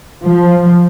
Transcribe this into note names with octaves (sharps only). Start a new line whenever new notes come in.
F3